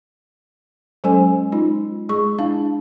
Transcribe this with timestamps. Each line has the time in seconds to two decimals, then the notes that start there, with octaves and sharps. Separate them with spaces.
1.04 F#3 G#3 C#4 A4 C5 G#5
1.52 G#3 D#4 F4
2.09 G#3 G#4 C#6
2.39 D4 E4 F5